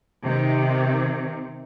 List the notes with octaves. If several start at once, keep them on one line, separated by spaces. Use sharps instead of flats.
C3 D#3